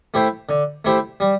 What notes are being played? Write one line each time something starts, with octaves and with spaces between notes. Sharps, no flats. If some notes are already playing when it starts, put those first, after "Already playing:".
A3 E4 G4 C5
D3
A3 E4 G4 C5
G3